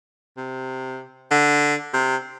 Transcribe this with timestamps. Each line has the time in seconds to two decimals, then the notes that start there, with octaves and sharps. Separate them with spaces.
0.37 C3
1.31 D3
1.94 C3